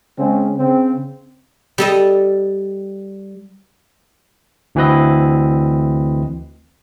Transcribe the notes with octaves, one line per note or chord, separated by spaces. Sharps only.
C#3 G#3 C4 C#4
C#3 C4
G3 A4 D#5
D2 E3 C4 B4 D#5